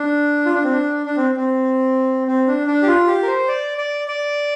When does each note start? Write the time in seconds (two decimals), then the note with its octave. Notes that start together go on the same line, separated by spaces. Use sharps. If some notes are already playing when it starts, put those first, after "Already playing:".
Already playing: D4
0.46 F4
0.55 D4
0.64 C4
0.72 D4
1.06 D4
1.17 C4
1.37 C4
2.28 C4
2.47 D4
2.67 D4
2.83 G4
2.88 F4
3.07 G4
3.23 A#4
3.27 C5
3.48 D5
3.78 D5
4.08 D5